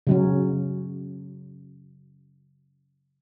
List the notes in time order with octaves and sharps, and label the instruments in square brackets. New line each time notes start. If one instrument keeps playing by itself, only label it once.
[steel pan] C#3 F#3 C#4